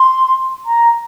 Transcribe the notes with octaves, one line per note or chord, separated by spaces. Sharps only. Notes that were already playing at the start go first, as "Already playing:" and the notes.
Already playing: C6
A#5